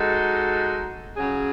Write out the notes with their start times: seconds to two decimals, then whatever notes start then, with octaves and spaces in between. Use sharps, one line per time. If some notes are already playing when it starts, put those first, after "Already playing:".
Already playing: G#3 D#4 F#4 A4
1.17 C#3 F#3 C#4 G#4